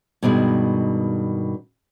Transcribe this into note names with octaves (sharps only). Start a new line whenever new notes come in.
G2 B2 D#3 G#3